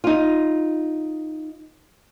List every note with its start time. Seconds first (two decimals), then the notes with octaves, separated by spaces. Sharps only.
0.04 D#4 F4